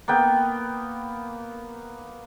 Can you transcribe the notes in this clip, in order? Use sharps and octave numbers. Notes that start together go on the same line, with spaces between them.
A#3 B3 G5